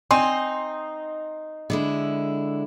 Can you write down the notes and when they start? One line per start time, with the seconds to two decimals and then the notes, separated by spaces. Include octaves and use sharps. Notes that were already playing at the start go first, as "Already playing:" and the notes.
0.11 C4 D#4 G#5 C6
1.70 D3 G#3 E4